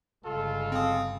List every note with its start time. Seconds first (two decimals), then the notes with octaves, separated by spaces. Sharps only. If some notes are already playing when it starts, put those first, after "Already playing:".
0.25 G1 C#3 G#3 F4 A4
0.72 C4 F5 D#6